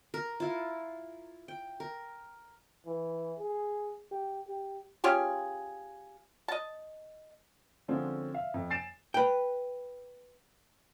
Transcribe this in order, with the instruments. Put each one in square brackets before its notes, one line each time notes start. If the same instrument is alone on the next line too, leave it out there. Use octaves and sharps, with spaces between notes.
[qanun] A#4
E4 F4
G5
A#4
[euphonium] E3
G#4
G4
G4
[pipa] C#4 F4 G4 G#4
D#5 A5
[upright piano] D3 F3 G#3 C4 C#4
E5 F5
F2
G#5 A6 C7 D7 E7
[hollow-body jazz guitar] B4 G5